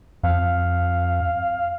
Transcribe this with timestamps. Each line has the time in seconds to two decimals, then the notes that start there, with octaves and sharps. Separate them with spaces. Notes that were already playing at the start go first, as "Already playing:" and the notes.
0.23 F2 F5